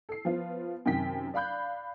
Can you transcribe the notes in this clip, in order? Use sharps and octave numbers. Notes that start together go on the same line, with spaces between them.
A4 C7
F3 B3 F4
F#2 C3 D#3 G5 B6
D5 F5 B5 F#6 G6